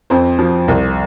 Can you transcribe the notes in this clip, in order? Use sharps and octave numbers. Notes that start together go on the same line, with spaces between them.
F2 C5
F3
C2